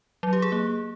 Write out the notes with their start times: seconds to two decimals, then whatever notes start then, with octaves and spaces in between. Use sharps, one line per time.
0.23 F#3
0.33 G4
0.42 G#4
0.52 A#3